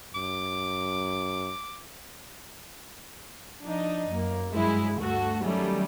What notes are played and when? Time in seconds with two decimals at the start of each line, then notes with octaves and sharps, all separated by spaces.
0.14 F#2 D6
3.63 F3 D4 D#4
4.11 F#2 A#3
4.52 G2 F#3 G#3 E4
4.97 D2 G2 A3 F#4 A4
5.44 D#3 F#3 G3 A3 C#4